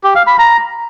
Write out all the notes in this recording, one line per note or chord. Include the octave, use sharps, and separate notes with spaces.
G4
F5
B5
A#5